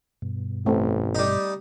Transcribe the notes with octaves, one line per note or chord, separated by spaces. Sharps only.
G2 B2
A1 A3 C4
G3 D#4